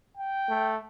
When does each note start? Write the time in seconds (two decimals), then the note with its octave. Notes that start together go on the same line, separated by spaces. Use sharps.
0.17 G5
0.49 A3